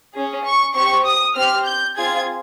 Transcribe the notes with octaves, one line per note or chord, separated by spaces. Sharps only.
C#4 G#4
C#6
C4 G4 C#6
D#6
C4 G4 F6
G6
C4 F4 G#4 G#6